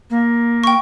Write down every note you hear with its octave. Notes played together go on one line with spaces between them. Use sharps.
A#3
G5 C#6